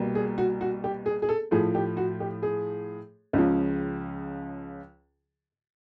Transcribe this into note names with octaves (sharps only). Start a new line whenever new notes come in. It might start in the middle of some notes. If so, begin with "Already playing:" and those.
Already playing: C2 B2 G3 A#3
G#4
F#4
F#4
G4
G#4
G#4
A4
A2 F3 A3 G#4
G4
F#4
G4
G#4
C#2 C#3 F3